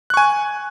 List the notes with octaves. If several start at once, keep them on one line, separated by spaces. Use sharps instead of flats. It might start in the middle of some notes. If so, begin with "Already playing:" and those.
G#5 C#6 F#6